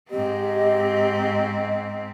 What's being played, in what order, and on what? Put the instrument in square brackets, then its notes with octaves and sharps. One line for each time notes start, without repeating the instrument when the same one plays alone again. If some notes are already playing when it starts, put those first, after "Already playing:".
[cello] G#2 C4 [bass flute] G4 [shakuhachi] D#5